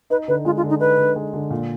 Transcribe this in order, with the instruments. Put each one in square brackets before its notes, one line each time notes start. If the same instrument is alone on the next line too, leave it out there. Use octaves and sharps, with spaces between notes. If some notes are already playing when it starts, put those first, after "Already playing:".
[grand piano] D#4 [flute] B4
[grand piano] D3 [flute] B4
[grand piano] G#3 [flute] F4
[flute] F4
[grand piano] D3
[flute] D#4
[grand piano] D#4 [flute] B4
[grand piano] D3
G#3
D3
A#2